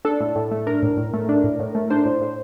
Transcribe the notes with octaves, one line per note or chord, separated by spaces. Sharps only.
D4 A4
A2
A2
A3
D4 A#4
A2
A2
A3
D4
A2
A2
A3
D4 C5
A2
A2